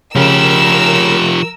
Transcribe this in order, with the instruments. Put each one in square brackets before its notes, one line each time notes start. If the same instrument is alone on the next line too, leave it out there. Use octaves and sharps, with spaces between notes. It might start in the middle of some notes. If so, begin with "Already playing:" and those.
[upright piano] C#3 [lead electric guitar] F3 G4 [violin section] A#4 E6